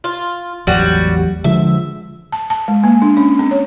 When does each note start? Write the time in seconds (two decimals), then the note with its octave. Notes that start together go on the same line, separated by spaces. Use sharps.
0.04 F4
0.67 A1 E2 F#3 G3 F#4
1.44 D3 F3 G#3 E5
2.32 A5
2.50 A5
2.68 G#3
2.84 A#3
3.02 D4
3.17 C#4
3.39 C4
3.51 C#5